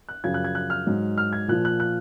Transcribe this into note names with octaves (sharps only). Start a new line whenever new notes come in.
F#6
F#2 C#3 F3 G#6
F#6
G#6
F#6
F6
G#2 F#3
F6
G#6
A#2 F3 F#6
F#6
F#6